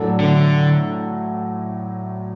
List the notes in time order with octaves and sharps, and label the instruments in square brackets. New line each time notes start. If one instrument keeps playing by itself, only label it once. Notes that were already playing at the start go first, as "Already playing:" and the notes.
Already playing: [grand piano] A2 F#3 D4 A4
[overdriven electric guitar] D3